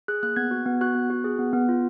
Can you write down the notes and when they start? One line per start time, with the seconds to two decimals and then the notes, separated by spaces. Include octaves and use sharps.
0.08 G#4 F#6
0.23 A#3 F#6
0.36 B3 G#6
0.51 F#4
0.66 B3
0.81 F#4 F#6
0.95 B3
1.10 F#4
1.24 G#4
1.39 B3
1.53 B3
1.69 F4